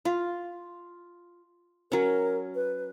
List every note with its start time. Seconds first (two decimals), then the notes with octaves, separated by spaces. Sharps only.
0.05 F4
1.92 F#3 C#4 A#4
2.55 B4